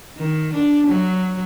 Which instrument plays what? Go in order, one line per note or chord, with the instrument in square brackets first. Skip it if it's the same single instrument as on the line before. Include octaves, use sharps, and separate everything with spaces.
[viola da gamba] D#3
D4
F#3